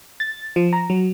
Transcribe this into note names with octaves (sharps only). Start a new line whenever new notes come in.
A6
F3
A#5
F#3